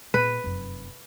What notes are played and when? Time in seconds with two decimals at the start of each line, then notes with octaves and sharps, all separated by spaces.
0.14 A#2 B3 B4
0.44 F1 F#2